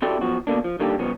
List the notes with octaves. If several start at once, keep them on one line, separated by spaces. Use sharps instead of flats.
C4 E4 F#4 G4 A4 D5
B1 B2 F3 F#4
B2 D3 A#3 D4
F3
D3 D#3 G3 A#3 G4 A4
C2 C#3 F3 B3 C#4